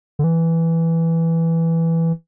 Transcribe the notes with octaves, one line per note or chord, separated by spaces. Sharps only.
D3
E3